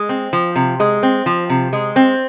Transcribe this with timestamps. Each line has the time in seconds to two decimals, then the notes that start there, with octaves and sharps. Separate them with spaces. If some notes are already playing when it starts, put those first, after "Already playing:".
Already playing: G#3
0.09 C4
0.33 F3
0.56 C3
0.80 G#3
1.03 C4
1.26 F3
1.50 C3
1.73 G#3
1.96 C4